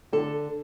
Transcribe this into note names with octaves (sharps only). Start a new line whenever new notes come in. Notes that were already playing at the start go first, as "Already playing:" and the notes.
D3 A4